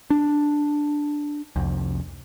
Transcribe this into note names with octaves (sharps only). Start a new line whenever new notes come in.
D4
C2 F2